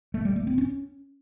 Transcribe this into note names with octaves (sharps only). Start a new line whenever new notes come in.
A3
G3
A3
C4
C#4